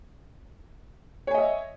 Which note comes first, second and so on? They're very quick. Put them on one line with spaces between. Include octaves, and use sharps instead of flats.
C#5 G#5 D#5 E5